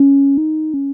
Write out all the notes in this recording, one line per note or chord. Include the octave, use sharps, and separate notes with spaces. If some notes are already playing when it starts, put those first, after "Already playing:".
Already playing: C#4
D#4
C#4